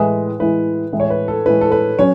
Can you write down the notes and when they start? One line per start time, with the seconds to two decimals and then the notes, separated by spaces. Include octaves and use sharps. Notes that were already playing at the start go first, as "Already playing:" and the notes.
Already playing: A2 E3 G#3 B4
0.39 A2 E3 G#3 B4
0.93 A2 E3 G#3
1.00 C#5
1.10 B4
1.28 A4
1.46 A2 E3 G#3 B4
1.61 A4
1.72 B4
1.99 F#3 C#4 C#5